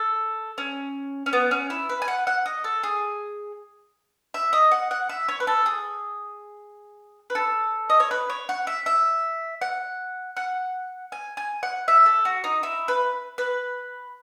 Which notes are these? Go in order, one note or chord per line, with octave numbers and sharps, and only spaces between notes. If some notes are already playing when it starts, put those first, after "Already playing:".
Already playing: A4
C#4
C#4
B3
C#4
E4
B4
G#5
F#5
F#5
D#5
A4
G#4
E5
D#5
F#5
F#5
E5
C#5
B4
A4
G#4
B4
A4
D#5
C#5
B4
C#5
F#5
E5
E5
F#5
F#5
G#5
G#5
F#5
E5
A4
F#4
D#4
E4
B4
B4